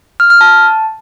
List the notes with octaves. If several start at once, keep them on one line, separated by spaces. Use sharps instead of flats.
F6
F6
A5